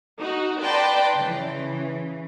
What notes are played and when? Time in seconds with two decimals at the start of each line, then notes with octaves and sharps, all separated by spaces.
0.18 D#4 F#4
0.61 B4 D5 G5 A5 A#5 C6
1.18 C#3 E3